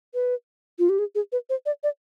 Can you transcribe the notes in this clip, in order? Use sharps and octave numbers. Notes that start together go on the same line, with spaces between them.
B4
F4
G4
G#4
G#4
B4
C5
D5
D5